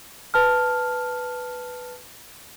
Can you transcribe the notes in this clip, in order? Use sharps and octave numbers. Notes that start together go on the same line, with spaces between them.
B4 A5 F6